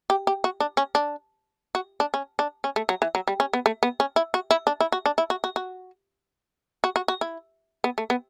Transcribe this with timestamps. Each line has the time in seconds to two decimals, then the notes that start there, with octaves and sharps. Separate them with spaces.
0.10 G4
0.27 G4
0.44 F#4
0.60 D4
0.77 C#4
0.95 D4
1.75 F#4
2.00 D4
2.14 C#4
2.39 D4
2.64 C#4
2.76 A3
2.89 F#3
3.02 E3
3.15 F#3
3.28 G3
3.40 C#4
3.53 B3
3.66 A3
3.83 B3
4.00 C#4
4.16 E4
4.34 F#4
4.51 E4
4.67 D4
4.80 E4
4.92 F#4
5.06 D4
5.18 E4
5.30 F#4
5.44 F#4
5.56 F#4
6.84 F#4
6.96 F#4
7.08 F#4
7.21 E4
7.84 B3
7.98 A3
8.10 B3